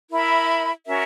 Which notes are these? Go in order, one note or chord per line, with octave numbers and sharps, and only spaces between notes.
E4 A#4 E5 B5
C#4 F#4 A#4 E5